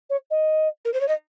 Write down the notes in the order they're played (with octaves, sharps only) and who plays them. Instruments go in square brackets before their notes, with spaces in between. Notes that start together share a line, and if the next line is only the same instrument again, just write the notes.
[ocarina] C#5
D#5
[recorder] A#4
C5
C#5
D#5